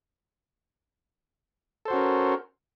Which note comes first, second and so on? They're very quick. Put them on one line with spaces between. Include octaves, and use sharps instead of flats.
A4 C5 F#4 C#4 A#4